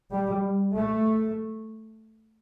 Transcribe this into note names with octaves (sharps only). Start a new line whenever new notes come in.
G3
A3